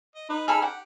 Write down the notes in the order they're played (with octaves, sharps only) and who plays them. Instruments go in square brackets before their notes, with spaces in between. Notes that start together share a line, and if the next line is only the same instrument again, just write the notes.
[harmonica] D#5
[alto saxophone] D#4 [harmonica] B4
[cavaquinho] G#4 A4 B5 [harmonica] E6 F6
[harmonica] G4 [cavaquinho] F#5